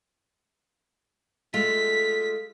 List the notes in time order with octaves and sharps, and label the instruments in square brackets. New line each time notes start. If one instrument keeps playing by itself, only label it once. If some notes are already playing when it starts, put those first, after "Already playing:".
[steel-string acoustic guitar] G#3 A3 F4 [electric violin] B6